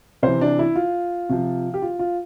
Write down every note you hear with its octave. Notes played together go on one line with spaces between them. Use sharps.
C3 E3 C5
D4
E4
F4
C3 F3
G4
F4
F4